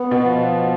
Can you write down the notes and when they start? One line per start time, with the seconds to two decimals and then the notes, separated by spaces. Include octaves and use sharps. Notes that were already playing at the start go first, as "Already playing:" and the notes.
Already playing: B3
0.11 B2
0.23 F3